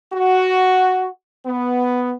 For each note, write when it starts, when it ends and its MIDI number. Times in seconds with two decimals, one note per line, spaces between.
0.13 1.09 66
1.46 2.14 59